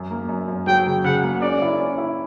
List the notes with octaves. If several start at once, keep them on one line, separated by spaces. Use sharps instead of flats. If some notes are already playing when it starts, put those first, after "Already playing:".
Already playing: F#2
A#3
F#2
F#2
F#3 G5
C#3
C#3 F#5
A#3
C#4 D5
E4
C#4
E4